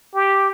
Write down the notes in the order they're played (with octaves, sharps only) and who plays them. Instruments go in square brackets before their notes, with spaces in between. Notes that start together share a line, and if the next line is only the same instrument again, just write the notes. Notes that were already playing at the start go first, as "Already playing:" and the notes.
[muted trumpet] G4